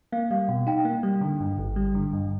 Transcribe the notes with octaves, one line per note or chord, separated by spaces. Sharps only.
A#3 F5
G3 F5
B2 F#5
D#4 G5
A#3
G3
D3
G2
G#1
G3
D3
G2